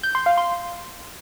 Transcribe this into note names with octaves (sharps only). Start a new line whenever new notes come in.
G6
C6
F5
C6